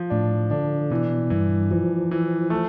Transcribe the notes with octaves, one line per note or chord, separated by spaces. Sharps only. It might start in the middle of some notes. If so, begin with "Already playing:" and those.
Already playing: F3
A2 D4
D3 D4
B2 E3
G2 E3
E3 F3
E3
A3